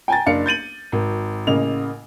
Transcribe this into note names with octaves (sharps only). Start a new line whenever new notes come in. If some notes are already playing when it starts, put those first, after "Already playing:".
G5 G#5 A#5 A6
F#1 D4 F5 C#7
G6 A6 D#7 F#7
G#1
A1 C#3 A#3 D#5 F7